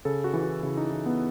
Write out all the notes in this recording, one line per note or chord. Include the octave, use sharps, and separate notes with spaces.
C#3 A4
F#4
E3 E4
F#4
C#3 E4
D#4
E3
B3